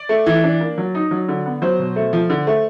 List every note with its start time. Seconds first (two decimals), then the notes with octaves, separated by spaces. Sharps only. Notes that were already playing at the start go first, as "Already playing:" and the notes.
Already playing: D5
0.09 A3
0.26 E3
0.44 D4
0.61 A#3
0.78 F#3
0.95 D#4
1.11 F#3
1.28 D3
1.46 B3
1.62 F#3 C5
1.79 B2
1.96 A3
2.13 F3
2.30 D3
2.47 A3